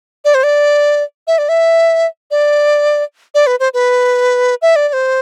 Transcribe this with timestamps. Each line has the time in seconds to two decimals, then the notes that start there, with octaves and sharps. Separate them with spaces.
0.25 D5
0.34 C5
0.43 D5
1.27 E5
1.38 D5
1.49 E5
2.31 D5
3.35 D5
3.47 B4
3.60 C5
3.74 B4
4.62 E5
4.76 D5
4.89 D5
4.93 C5